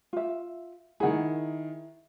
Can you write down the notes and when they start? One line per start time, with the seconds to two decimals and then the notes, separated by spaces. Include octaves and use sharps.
0.13 F4 E5
1.00 D#3 E4 G#4 F#5